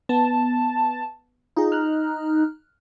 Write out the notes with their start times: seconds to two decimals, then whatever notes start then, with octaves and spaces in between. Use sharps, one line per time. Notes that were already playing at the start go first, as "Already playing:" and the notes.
0.09 B3 A5
1.57 D#4 F4 G#4
1.72 F6 F#6